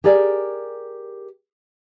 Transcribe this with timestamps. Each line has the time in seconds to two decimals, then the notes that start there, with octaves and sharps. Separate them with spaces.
0.04 G4 G#4 A#4 D5 G#5